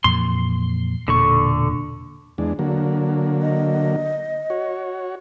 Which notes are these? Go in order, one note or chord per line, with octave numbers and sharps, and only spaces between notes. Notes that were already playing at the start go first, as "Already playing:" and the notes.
F2 A#2 E3 C6
E1 A#2 D3 A4 C#6
E2 G#3 D4
D3 F#3 A#3
D#5
F#4 C#5